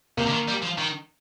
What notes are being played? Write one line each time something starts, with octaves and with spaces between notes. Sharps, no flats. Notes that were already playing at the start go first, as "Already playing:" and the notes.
C3 A#3
D3
D#3
G3
F3
D#3